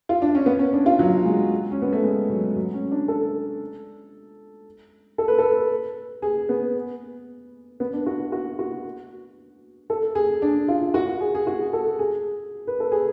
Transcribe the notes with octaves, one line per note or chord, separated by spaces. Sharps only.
F4
D4
C#4
B3
C#4
D4
F4
F#3
G#3
C#4
B3
A3
G#3
F#3
F#3
C#4
D4
A4
A4
B4
A4
G#4
B3
B3
D4
F#4
F#4
F#4
A4
G#4
D4
F4
F#4
G#4
G#4
F#4
A4
G#4
B4
A4
G#4